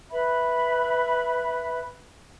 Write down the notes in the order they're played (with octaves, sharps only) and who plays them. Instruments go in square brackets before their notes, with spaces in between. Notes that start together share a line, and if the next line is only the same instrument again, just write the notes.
[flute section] B4 E5 B5